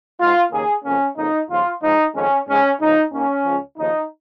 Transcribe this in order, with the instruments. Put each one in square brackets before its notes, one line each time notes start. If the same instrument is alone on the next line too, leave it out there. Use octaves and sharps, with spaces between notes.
[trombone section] G#2 G#3 F4
D#2 C#3 A#3 G#4
F2 C#3 A#3 C#4
F2 C#3 A#3 D#4
D#2 C#3 F3 F4
G#2 F3 G#3 D#4
F2 D#3 G#3 C#4
G#2 G#3 C#4
C#2 C#3 F3 D#4
D#2 D#3 A#3 C#4
C#2 C#3 F3
D#2 C#3 F3 D#4